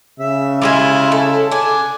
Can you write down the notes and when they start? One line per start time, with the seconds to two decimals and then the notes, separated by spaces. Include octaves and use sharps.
0.19 C#3 E5
0.62 G3 G#3 E4 F4 G#5
1.12 A4
1.51 D4 G#5